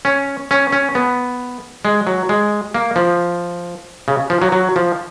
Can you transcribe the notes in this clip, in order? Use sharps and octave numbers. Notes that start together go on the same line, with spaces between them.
C#4
C#4
C#4
B3
G#3
F#3
G#3
A#3
F3
C#3
F3
F#3
F#3
F3